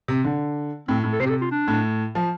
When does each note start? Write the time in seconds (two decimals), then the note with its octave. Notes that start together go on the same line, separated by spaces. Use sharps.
0.08 C3
0.24 D3
0.88 A2 C4
1.04 A2
1.13 A4
1.20 C3 C5
1.26 G4
1.30 A4
1.42 F4
1.51 D4
1.68 A2
2.15 F3